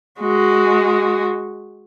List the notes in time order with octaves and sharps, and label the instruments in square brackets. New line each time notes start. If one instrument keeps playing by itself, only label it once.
[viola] G#3 F#4